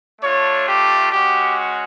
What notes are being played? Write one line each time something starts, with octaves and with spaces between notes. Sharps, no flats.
A3 D4 F4 C#5
G4
G#3 C#4 F#4 G4